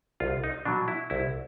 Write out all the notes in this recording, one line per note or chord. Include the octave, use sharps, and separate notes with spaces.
C2 F4
D#4
B2 F#3 D4
E4
C2 E4